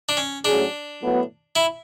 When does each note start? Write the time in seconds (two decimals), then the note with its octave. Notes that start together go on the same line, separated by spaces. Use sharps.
0.09 D4
0.17 C#4
0.44 A2 F#3 C#4 D4 G#4
1.01 A2 F#3 B3
1.56 E4